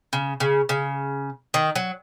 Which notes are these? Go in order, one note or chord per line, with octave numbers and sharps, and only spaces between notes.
C#3
C#3
C#3
D#3
F#3